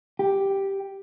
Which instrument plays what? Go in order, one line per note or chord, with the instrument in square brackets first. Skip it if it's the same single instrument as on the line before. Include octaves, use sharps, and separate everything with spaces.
[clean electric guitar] G4